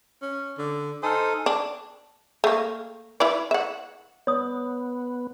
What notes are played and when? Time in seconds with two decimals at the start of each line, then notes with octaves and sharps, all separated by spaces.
0.22 C#4
0.58 D3
1.03 D#4 A4 C5 G#5 D#6 F6
1.46 D4
2.44 A3 A#3
3.20 E4 B4 D5
3.51 E5 F#5
4.27 B3 C#5 D#6